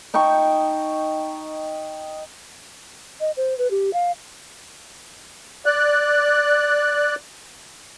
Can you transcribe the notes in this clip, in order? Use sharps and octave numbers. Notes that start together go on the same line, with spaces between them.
D#4 G5 A5 C#6
D#5
C5
B4
G4
F5
D5 F#6